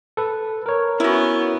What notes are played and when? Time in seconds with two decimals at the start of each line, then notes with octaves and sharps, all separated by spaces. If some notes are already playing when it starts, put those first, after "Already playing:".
0.17 A4 B4
0.66 A#4 C#5
1.00 B3 C#4 E4 F#4